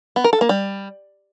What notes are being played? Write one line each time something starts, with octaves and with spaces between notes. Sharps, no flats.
B3
A#4
A4
A#3
G3